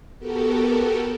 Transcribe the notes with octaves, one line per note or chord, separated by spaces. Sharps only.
B3 F#4 G4 A4 A#4